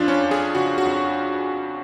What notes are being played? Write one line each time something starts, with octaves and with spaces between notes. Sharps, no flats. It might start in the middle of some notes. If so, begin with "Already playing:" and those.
Already playing: F2 F3 D4 F4
C#4
F2
G#4
C#3 F#4
F#4
F2